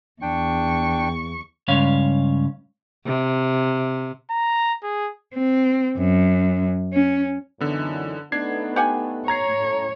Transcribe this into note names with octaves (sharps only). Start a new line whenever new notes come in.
E2 D4 G5 C#6
C#2 G2 C#4 C#5 F5
C3
A#5
G#4
C4
F#2
C#4
F#2 D3 E3 B3 D#4
A3 B3 D4 D#4 G#6 C7
G4 F#5 G#5
C#5 A#5 G#6 C7
A2 C#4